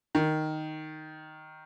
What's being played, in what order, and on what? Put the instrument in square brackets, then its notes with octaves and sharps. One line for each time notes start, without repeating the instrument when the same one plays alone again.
[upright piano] D#3